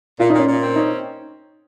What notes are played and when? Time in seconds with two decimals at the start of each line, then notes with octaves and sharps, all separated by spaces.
0.19 A#2 F4
0.30 D#4
0.33 A#2 C#4
0.47 A#2
0.63 C4
0.76 C#4 D#4